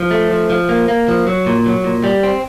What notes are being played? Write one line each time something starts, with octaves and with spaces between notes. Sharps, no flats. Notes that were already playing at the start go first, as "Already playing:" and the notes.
Already playing: F3
A3
F3
F3
A#3
A#3
F3
F#3
A#2
F#3
A#2
G3
C4